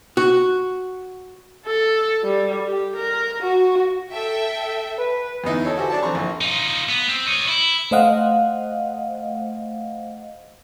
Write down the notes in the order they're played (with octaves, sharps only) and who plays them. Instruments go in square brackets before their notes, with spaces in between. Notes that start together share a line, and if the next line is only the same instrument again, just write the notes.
[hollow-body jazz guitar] F#4
[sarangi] A4
G3
G4
A#4
F#4
[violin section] A4 E5 G5
[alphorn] B4
[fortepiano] E2 B3 D#4 E4
E4 A4 C#5
F#4 G4 A4 C5 G#5
D4 D5 A5
D3 E3 C4 A#5 C#6
A#1
[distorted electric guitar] D#4 F4
B3
C4
C#5 D#5
E4
[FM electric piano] A3 C5 D#5 F5 F#5